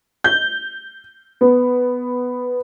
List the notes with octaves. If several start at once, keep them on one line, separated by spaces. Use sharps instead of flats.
G6
B3